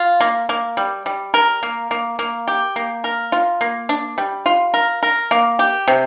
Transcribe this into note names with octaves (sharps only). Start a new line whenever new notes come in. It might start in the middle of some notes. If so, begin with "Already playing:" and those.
Already playing: F4
A#3
A#3
G3
G3
A#4
A#3
A#3
A#3
G4
A#3
A#4
F4
A#3
D4
G3
F4
A#4
A#4
A#3
G4
C3